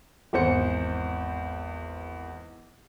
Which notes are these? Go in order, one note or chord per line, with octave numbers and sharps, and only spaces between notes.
G#1 E2 C5 C#7